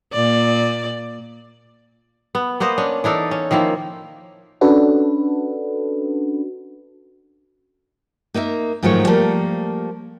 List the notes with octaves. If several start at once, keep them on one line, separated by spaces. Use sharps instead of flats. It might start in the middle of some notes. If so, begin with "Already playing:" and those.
A#2 D5
B3
A#3 B3 C5 D#5
C#4 D4
E3 D4 D#4 A4
C#4
D#3 F3 A#3 E4
C#4 D4 F#4 A4 B4
A#3 D#4 A#4 E5
G#2 D#3 F3 F#3 A3 C#5
F3 G3 A3 A#3 A#4